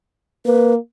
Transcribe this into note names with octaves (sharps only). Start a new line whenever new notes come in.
A#3 B4